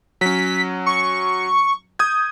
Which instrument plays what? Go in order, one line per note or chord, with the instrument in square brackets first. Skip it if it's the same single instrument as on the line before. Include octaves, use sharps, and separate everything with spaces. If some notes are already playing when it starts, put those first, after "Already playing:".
[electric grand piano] F#3 C#4 [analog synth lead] B6
[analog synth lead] C#6
[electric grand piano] D#6 G6 G#6